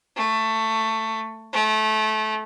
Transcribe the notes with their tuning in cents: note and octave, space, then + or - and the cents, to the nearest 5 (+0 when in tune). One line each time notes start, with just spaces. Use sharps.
A3 +15
A3 -20